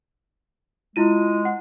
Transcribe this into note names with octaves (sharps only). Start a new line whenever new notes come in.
G#3 E4 F4 D#7
F#5